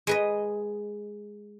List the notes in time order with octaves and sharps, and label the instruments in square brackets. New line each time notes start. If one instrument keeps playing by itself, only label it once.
[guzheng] G#3 B4 D#5